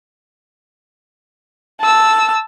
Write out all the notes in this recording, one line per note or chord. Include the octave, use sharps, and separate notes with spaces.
A5 E6